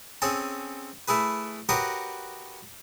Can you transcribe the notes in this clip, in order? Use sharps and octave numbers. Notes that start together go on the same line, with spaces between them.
C4 C#4 G#4 A4
A3 E4 G#4 B4
F#4 G4 A#4 B4 C#5 D#5